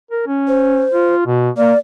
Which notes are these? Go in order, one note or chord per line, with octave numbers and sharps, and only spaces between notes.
A#4
C#4
C5
F4
B2
A#3 D5